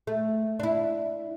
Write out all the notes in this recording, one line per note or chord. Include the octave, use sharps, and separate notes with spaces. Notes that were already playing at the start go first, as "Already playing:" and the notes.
A3
D4 E4